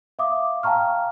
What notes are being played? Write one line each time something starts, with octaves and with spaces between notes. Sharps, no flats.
E5 F5 D6 D#6
F5 G5 A5 A#5 C#6 F6